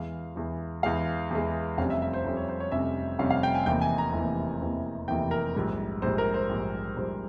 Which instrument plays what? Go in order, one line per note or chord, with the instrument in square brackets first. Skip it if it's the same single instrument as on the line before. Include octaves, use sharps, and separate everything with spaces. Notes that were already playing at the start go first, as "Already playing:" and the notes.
Already playing: [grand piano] E2 E3 G#3 F5
E2 E3 G#3
E2 E3 G#3 F5
E2 E3 G#3
F1 F2 C3 G3 C#4 F5
E5
E5
C5
F1 F2 C3 G3 C#4 C5
C#5
C5
C#5
F1 F2 C3 G3 C#4 E5
F1 F2 C3 G3 C#4 F5
F5
G5
G#5
F1 E2 C3 E3 A#3 G5
G#5
A#5
F1 E2 C3 E3 A#3
F1 E2 C3 E3 A#3
F1 E2 C3 E3 A#3 G5
A#4
A#1 G#2 G3
A#1 G#2 G3 C5
A#4
C5
A#1 G#2 G3
A#1 G#2 G3 C5